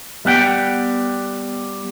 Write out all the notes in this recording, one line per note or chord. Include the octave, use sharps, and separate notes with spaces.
G3 B3 F#5 G5